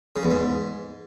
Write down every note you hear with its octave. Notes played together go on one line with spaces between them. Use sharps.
C#3
E2
G#2